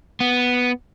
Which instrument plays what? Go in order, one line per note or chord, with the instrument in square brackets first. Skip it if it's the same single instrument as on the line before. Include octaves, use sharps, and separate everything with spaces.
[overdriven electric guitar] B3